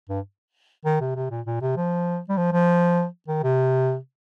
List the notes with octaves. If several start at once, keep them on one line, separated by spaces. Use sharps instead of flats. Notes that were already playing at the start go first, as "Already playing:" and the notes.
G2
D#3
C3
C3
A#2
A#2
C3
F3
G3
F3
F3
D#3
C3